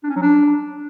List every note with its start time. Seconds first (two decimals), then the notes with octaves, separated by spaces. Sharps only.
0.04 D4
0.10 C#4
0.16 F#3
0.22 D4